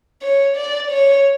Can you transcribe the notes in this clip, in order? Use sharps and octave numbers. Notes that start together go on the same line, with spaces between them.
C#5
D5
C#5